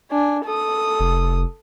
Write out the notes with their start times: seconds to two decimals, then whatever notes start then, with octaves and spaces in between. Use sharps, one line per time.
0.11 D4 G#5
0.44 A4 D#6
1.00 F1